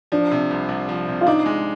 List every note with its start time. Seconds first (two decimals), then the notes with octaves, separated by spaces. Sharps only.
0.12 F3 D4
0.31 C3
0.51 C2
0.69 C2
0.89 F3
1.08 C3
1.21 F4
1.27 D4 D#4
1.46 G#3